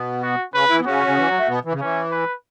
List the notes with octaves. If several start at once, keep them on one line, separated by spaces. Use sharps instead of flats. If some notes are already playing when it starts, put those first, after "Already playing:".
Already playing: B2 B3
F#4
C#3 C#4 B4
E3 E4
B3
C#3 C#4 F#4
C#3
E3
F#3
A3
B2 B3
E3
C#3
E3 C#4
B4